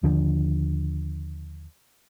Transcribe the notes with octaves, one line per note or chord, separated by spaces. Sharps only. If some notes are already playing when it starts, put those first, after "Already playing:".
D#2 D3 F3 D4